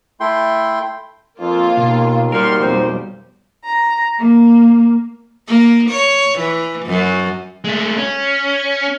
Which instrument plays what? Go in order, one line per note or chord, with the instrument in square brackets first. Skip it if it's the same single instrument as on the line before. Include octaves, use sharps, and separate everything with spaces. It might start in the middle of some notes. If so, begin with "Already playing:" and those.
[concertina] A3 E4 G5 C6
[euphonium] F2 [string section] A#3 F4
[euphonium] D#2 [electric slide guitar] B2
[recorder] G3 [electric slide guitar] F#4 A#4 [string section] C6 F6
[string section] B1 F2 G3 [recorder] C5
[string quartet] A#5
A#3
[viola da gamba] A#3
C#5
E3
F#2
[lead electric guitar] G#3 A3
C#4